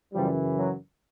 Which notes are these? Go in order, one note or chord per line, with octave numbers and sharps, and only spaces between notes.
F#2 C#3 E3 F3 G3
F#3